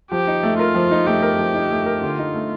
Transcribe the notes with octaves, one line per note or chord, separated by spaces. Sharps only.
F3 G4
D#4
A3
F4 A#4
F3
D#4
A3 G4
A#4
F3
D#4
A3
A#4
D3 F4
D#4
A3